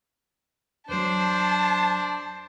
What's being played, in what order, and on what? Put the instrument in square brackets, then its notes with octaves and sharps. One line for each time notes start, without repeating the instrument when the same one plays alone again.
[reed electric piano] E2 F#3 [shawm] D4 [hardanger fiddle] C5 [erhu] A5